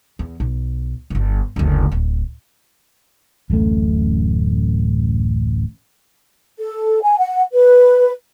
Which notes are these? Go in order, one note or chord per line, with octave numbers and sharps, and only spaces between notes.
E2
B1
D1 G1
F#1 D2
D1
D1 A1 F#2 A3
A4
G#5
F#5
B4